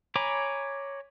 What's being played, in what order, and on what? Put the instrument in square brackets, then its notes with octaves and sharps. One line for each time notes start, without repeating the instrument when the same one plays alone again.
[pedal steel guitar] C#5 G#5 A#5 B5 D6